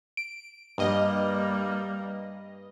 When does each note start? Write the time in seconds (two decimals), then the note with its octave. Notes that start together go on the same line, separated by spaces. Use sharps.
0.17 D7
0.78 G2 G3 A#3 D#5